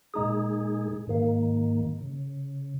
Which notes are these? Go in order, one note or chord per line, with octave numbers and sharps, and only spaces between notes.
A#2 G#3 D#4 G#4
G#2 D#3 A#3
C#3